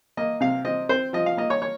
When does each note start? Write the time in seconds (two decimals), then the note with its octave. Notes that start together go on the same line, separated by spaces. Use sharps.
0.17 A#3 D#5
0.40 C3 F5
0.65 C4 D#5
0.89 C4 C5
1.13 F3 D#5
1.26 F5
1.37 A#3 D#5
1.50 C#5
1.62 C#5